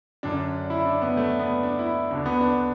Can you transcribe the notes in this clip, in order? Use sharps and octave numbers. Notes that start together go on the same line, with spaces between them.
F#2 D3 D4
E4
D4
B3
A3
B3
D4
E4
D2 D3 D4
B3
D4